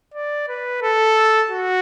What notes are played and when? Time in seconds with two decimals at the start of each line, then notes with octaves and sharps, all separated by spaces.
0.14 D5
0.48 B4
0.82 A4
1.50 F#4